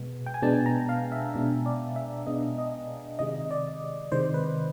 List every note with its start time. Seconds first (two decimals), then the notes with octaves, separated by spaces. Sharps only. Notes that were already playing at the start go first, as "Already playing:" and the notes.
Already playing: B2 G#3 B3
0.26 G5
0.34 G#5
0.42 B2 G#3 B3 D4 A5
0.66 A#5
0.89 F5
1.12 E5
1.34 B2 G#3 B3 D4 E5
1.66 D5
1.96 E5
2.27 B2 G#3 B3 D4 D#5
2.58 D#5
3.19 C3 D#3 G#3 D#5
3.51 D5
4.12 C3 D#3 G#3 C5
4.34 B4